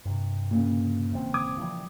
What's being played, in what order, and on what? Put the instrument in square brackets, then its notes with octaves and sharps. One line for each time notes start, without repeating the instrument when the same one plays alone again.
[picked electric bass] G2 C3
[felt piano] A#2 C#3
[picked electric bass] E1 E2 C4
[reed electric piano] D6 D#6 G#6
[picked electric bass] E3 F3 G3